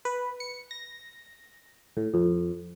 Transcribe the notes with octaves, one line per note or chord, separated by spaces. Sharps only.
B4
C#7
A#6
A2
F2